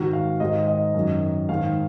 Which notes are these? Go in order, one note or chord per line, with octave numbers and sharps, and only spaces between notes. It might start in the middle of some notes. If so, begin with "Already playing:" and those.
Already playing: G#2 D#3 F#4
F5
G#2 D#3 D#5
D#5
F#2 D#3
G#2 D#3 F5